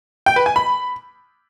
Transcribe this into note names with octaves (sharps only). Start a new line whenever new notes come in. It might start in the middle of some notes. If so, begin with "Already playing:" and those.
G5
B4
G#5
B5